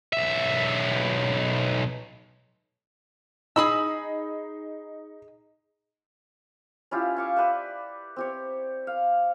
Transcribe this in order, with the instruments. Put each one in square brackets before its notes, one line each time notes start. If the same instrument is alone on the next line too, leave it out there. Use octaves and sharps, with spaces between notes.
[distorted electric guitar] B1 E5
[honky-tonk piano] D#4 [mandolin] G#4 B5 E6
[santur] C#4 E4 F4 G4
F5 C#6 D6
G4 B4 D5 E5
C4 G4 C#5
F5